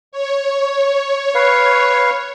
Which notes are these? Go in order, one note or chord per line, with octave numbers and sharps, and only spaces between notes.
C#5
B4 F5